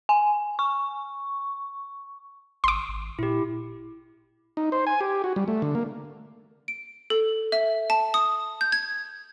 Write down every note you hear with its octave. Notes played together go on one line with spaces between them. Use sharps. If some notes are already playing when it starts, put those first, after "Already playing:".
G#5
C#6
G#1 C6 D6
G#1
A#2 E4 G4
D#4
C5
G#5
G4
F#4
G3
A3
D3
A#3
D7
A4
E5
A5
D#6
G6
G#6